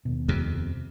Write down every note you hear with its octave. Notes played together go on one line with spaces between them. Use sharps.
D#2 B2
F2 C3